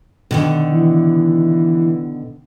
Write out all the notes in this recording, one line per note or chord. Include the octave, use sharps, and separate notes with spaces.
B2 D3 D#3
E3